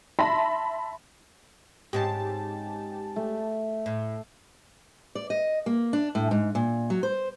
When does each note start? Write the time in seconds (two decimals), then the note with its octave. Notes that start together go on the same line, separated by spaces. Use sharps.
0.19 E5 A5 B5 C6 A#6
1.93 G#2 C4 C#4 G4 A5
3.16 A3
3.86 A2
5.15 D5
5.30 D#5
5.66 A#3
5.93 D4
6.15 A2
6.31 G#2
6.55 A#2
6.90 F#3
7.03 C5